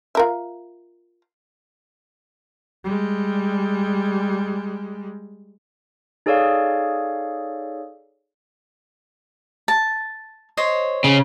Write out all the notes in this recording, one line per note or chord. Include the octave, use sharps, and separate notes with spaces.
F4 A#4 E5
G3 G#3
D#4 G#4 A4 C#5 D5 F5
A5
C5 C#5 D#5
C#3